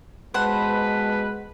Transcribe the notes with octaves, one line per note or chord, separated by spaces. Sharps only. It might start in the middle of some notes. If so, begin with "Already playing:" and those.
B2 G#3 B4 C5 F#5 A5 B5